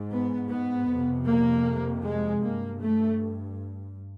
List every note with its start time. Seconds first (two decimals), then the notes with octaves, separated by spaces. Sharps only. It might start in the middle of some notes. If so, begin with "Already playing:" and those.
Already playing: G#2
0.11 B3
0.50 B3
0.89 F2 C3
1.27 A#3
2.04 G#3
2.43 G2 A#3
2.81 A3